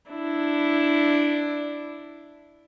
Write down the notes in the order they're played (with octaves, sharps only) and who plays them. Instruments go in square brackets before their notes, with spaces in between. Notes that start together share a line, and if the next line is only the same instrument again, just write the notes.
[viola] D4 E4